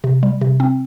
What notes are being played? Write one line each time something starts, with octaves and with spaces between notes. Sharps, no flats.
C3
G3
C3
C4